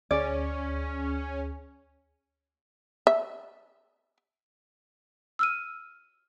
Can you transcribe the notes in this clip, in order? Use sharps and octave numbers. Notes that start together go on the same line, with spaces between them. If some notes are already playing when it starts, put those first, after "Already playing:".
D2 C#4 G#4 D5
E5
E6 F6 D#7